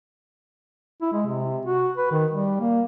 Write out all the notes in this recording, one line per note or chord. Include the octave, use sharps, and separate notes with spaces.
E4
G#3
C3
F#4
B4
D#3
G3
A#3